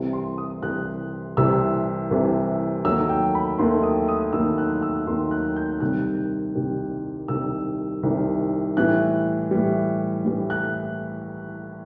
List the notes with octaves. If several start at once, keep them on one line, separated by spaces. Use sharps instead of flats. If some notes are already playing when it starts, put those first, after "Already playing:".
Already playing: C2 C3 E3
C6
D#6
C2 C3 E3 F#6
C2 C3 E3 E6
C2 C3 E3
D#2 D#3 F#3 A3 E6
G5
B5
D#2 D#3 F#3 A3 C6
D#6
D#6
D#2 D#3 F#3 A3 E6
F#6
E6
D#2 D#3 F#3 A3 C6
F#6
G6
C2 C3 D#3 G3 F#6
C2 C3 D#3 G3
C2 C3 D#3 G3 E6
C2 C3 D#3 G3
A2 E3 G3 F#6
A2 E3 G3
A2 E3 G3
F#6